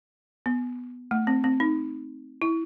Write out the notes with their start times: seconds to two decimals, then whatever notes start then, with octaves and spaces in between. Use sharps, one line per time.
0.46 B3
1.11 A3
1.27 C4
1.44 C4
1.60 D#4
2.42 E4